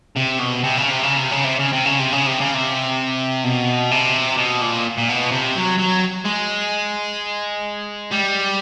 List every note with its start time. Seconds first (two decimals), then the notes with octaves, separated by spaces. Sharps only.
0.17 C3
0.39 B2
0.64 C3
0.77 C#3
0.90 C3
1.04 C#3
1.17 C3
1.32 C#3
1.45 C3
1.59 C#3
1.73 C3
1.86 C#3
1.99 C3
2.13 C#3
2.27 C3
2.41 C#3
2.54 C3
3.44 B2
3.91 C3
4.37 B2
4.61 A#2
4.98 A#2
5.09 B2
5.31 C3
5.55 F#3
5.78 F#3
6.25 G#3
8.12 G3